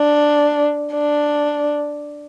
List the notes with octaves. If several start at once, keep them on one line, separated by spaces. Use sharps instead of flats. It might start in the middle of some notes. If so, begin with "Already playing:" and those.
Already playing: D4
D4